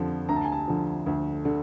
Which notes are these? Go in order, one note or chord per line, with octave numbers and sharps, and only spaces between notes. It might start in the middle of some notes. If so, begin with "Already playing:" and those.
Already playing: F2 D3 F3
D2 A#5
A5
G#5
A5
D3 F3
D2
D3